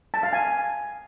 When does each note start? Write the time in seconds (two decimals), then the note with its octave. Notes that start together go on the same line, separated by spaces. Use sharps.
0.14 A5
0.23 F5
0.33 G#5